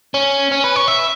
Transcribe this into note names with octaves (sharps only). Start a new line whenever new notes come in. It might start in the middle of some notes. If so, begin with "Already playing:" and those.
C#4
C#4
B4
C#5
E5